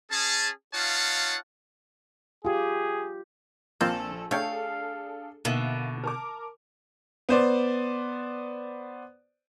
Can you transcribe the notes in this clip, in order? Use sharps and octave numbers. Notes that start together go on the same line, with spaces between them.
C#4 G#4 A5
D#4 F4 C#5 F5 F#5 A5
F4 G4 G#4
A#1 A#3 C4 F4 A4
A3 D4 G#4 A4 C#5 F5 G5
B2 D3 A#3 D#4 E5
A#4 A5 D6
B3 C5 D5